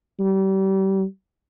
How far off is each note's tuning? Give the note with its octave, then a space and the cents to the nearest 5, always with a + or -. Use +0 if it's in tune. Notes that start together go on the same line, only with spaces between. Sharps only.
G3 -30